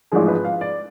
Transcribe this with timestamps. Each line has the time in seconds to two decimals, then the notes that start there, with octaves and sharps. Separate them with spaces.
0.12 A1 G#2 F3 G#3 G#4
0.28 B4
0.44 F5
0.61 D5